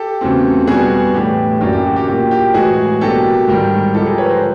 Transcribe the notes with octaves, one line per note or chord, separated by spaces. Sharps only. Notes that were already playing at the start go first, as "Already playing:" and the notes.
Already playing: G4 A4
E2 C#3 F#3 A3 C4
B2 G3 B3 D4 F#4 G#4
A2 E3 A3 D4 G4
F#2 D3 F#3 A#3 D4 G4
G4
F#4
G4
A#2 F#3 A#3 G4
G4
A2 E3 G#3 F#4 G#4
B2 F#3 A#3 D4 G4 A4
G#2 D#3 G3
D3 F3 G#3 G4 A4
G#4 A#4
B4 C#5
A#4 C5